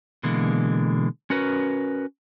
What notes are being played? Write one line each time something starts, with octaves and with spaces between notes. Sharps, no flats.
B2 D3 E3 G#3 A#3
C#4 F#4 A#4 B4